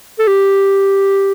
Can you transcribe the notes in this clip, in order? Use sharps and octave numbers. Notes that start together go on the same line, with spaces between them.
A4
G4